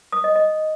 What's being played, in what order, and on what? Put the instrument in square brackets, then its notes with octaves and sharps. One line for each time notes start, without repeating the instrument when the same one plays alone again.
[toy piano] D#6
D#5
D#5